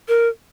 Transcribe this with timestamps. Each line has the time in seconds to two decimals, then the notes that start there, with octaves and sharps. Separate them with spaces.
0.08 A#4